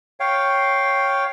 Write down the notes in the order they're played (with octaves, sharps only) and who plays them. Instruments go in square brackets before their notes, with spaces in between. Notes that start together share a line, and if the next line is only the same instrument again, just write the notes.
[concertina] C#5 F5 G5